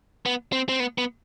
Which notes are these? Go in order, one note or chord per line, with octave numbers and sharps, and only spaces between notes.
B3
C4
C4
B3
B3